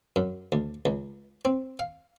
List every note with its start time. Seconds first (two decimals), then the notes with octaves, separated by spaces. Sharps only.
0.16 F#2
0.52 D2
0.85 C#2
1.45 C4
1.79 F5